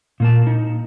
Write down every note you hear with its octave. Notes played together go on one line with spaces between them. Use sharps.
A#2 A#3 A5
D#4